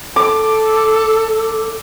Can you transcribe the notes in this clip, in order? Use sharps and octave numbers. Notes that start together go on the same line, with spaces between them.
A4 D6